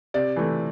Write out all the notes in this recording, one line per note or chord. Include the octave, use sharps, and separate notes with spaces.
C3 D5
E3 A3